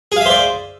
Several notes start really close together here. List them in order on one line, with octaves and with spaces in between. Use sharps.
G#4 F5 E5 C5 D5